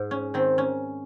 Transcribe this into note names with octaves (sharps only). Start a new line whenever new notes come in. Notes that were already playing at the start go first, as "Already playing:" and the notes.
Already playing: G#2
C#4
D#3 C4
C#4